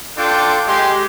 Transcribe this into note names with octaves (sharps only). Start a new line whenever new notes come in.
D4 F4 A4 G5 C6 D6
G#3 G4 C6